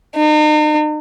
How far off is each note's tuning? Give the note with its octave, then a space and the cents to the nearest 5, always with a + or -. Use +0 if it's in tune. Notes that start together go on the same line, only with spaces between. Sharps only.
D#4 -40